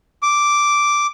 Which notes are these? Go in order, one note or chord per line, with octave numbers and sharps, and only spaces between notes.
D6